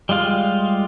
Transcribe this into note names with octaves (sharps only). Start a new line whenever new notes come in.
G3 G#3 F4 F5